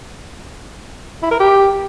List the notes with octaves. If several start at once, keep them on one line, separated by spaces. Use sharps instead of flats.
E4
A#4
G4